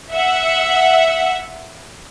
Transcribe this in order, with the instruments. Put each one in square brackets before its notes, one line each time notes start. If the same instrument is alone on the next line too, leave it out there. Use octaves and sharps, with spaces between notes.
[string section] E5 F#5